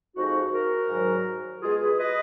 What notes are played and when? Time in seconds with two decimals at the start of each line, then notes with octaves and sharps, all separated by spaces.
0.15 F2 F3 G#3 D#4 F#4
0.52 F#4 A#4
0.88 G#2 D#3 F#3
1.61 B2 G#3 F4 G#4
1.80 G#4 B4
1.99 B4 D#5